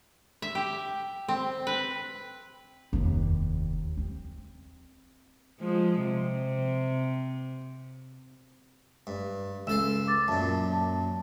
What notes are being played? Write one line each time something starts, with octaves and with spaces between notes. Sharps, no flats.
E5
G4
C4
B4
F1 D#2
C4
F3 G#3
C3
G2
C#2 A4 F5 E6 E7
D6 A6
F#2 A#2 A5
A5